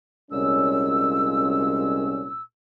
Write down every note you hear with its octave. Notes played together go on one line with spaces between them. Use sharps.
C2 A#2 G#3 C#4 E6